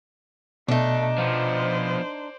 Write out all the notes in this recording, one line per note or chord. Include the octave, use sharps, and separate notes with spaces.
B2 A3 D4 D#4
F3 B3 C5 D5